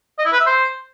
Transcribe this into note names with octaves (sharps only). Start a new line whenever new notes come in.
D#5
E4
B4
E5
C5